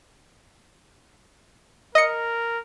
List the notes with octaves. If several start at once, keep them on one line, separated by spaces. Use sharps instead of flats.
A#4 D#5 C#7